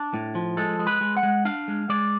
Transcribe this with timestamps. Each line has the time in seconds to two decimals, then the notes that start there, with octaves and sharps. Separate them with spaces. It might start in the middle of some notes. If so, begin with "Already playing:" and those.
Already playing: D4
0.14 A2
0.35 F3
0.57 G#3 A4
0.79 G#3
0.87 B4
1.01 G#3
1.17 F#5
1.23 G#3
1.45 D4 F5
1.68 G#3
1.89 G#3 D5